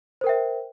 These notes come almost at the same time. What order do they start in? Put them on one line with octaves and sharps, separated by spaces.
C5 A#4 G5 E5